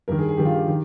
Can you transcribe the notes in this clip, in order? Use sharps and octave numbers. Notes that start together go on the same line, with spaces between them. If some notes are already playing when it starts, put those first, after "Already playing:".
G2 D#3 A#4
G#4
G#4
G2 D#3 G4
F4
G4
D#3